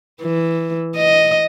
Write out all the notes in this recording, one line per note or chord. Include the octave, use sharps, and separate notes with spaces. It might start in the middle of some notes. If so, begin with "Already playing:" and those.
E3
D#5